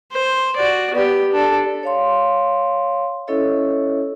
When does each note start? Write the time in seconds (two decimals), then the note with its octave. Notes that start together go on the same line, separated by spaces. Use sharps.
0.12 C5
0.56 F#4 D5
0.94 B3 G4
1.32 D4 A4
1.83 C#5 F5 C6
3.27 C#4 E4 A4 C#5 D#5 E5